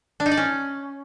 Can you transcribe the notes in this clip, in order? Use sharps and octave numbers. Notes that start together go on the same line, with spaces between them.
D4
D#4
D5
C#4